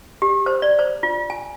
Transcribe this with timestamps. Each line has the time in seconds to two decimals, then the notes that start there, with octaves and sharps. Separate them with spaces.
0.22 G4
0.46 C5
0.62 D5
0.79 C5
1.03 F4
1.30 G#5